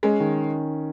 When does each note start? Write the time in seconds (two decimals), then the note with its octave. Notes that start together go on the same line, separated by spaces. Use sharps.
0.03 G#3 C#4
0.20 D#3